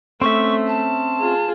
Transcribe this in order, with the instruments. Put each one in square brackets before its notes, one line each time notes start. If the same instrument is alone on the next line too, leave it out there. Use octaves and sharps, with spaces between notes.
[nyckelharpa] A3 [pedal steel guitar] C4 C#4 E5 [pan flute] C#6
[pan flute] A5
[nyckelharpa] F4 G#4